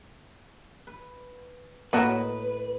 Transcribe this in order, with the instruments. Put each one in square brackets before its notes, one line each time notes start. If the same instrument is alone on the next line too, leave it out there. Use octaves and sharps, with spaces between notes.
[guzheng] B4
[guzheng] A2 D#5 [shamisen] A#3 F#4 A#4 [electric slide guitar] B4